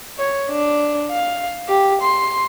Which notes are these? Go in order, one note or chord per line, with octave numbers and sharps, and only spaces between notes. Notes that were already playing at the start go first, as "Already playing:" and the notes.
C#5
D4
F5
G4
C6